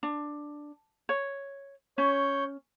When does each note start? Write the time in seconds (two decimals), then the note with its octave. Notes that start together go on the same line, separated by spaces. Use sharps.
0.03 D4
1.09 C#5
1.98 C#4 C#5 G6